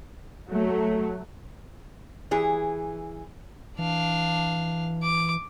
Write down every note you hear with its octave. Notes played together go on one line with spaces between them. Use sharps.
F#3 A3
E3 G#4
E3 D4 F5
D6